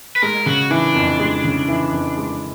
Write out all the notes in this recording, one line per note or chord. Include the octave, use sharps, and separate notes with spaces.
B4
G#3 A#4
C#3 F#4
E3 D4
F2
G#3
C#3
E3
F2
G#3